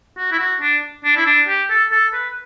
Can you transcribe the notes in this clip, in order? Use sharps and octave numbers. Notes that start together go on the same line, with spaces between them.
F#4
E4
F#4
D4
D4
E4
D4
G4
A4
A4
B4